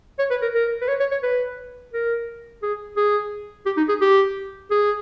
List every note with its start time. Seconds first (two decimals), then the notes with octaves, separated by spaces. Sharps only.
0.19 C#5
0.30 B4
0.42 A#4
0.55 A#4
0.81 B4
0.88 C#5
1.00 C#5
1.11 C#5
1.23 B4
1.93 A#4
2.62 G#4
2.97 G#4
3.66 G4
3.77 D#4
3.89 G#4
4.01 G4
4.71 G#4